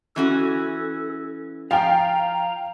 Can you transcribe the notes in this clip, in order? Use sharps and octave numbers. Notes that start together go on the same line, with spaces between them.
E3 C#4 F#4 A4
F3 F5 G5 A#5